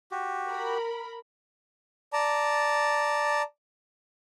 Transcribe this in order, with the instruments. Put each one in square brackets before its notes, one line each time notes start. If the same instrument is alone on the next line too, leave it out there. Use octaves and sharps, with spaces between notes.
[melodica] F#4 G4
[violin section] A#4 B5
[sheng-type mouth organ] D5 A5 A#5